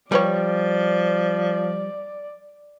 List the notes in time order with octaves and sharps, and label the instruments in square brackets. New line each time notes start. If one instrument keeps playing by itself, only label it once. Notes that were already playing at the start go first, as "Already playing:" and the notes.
[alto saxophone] F3 [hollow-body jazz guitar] G3 [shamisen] G4 B4 C#5 [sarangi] D5